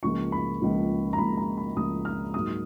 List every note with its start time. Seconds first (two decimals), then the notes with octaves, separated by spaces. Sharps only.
0.03 C#2 C#3 F3 A#3 C#6
0.32 B5
0.61 C#2 C#3 F3 A#3
1.13 A#5
1.18 C#2 C#3 F3 A#3 B5
1.37 A#5
1.58 B5
1.76 C#2 C#3 F3 A#3 D#6
2.05 F6
2.34 G#2 F#3 A#3 D#6